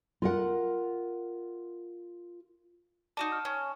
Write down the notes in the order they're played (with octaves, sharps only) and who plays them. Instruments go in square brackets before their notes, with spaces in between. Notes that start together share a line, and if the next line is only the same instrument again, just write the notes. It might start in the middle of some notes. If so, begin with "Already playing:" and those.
[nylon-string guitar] F4 A#4 F#5
[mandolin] D#4 F#4 D5 [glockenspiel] A5 E7
[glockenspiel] F6
[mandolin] C#4